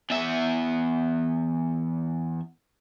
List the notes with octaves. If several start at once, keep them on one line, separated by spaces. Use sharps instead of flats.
E2 E5